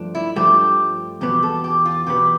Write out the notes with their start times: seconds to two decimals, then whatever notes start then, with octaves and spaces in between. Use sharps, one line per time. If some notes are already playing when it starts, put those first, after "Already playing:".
Already playing: G2 F3 A3 D4
0.15 E4
0.36 G2 F3 A3 D4 G4
1.21 E2 B2 B3 G4
1.43 A4
1.64 G4
1.85 F4
2.06 E2 B2 B3 G4